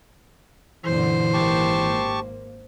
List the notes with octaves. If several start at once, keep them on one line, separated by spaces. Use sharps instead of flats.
F#2 A#2 D3 E3 C5
G#1 A#3 G4 A5 C#6